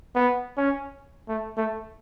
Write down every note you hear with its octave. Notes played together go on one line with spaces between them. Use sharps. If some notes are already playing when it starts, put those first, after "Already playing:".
B3
C#4
A3
A3